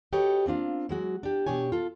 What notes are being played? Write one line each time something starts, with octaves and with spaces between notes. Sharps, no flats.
F#4 G4 A4 B4 C#5 D#5
A#3 C4 D4 F4
F#3 G#3 F#4
D4 G4
B2 D4 G4 C#5 G#5
F4 A4